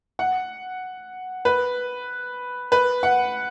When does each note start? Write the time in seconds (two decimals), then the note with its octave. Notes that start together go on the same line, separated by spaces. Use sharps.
0.19 F#5
1.45 B4
2.72 B4
3.03 F#5